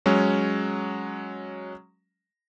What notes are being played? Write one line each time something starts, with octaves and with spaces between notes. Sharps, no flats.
F#3 G#3 C#4